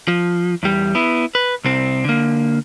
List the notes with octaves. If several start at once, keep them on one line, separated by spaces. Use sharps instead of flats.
F3
E2 G3
B3 E4
B4
C2 C4
D3 A#3